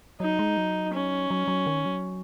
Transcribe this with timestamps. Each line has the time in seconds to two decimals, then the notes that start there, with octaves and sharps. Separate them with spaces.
0.20 F#3 D#4
0.39 G#3
0.57 F#3
0.94 C#4
1.31 F#3
1.48 F#3
1.66 D#3
1.85 F#3